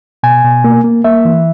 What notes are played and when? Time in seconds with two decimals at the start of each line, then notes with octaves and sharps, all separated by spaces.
0.23 B2 G#5
0.44 B2
0.64 A#3
0.84 A#3
1.04 A#3 E5
1.25 E3